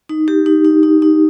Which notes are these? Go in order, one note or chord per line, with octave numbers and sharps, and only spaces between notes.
D#4
G4
D#4
D#4
D#4
D#4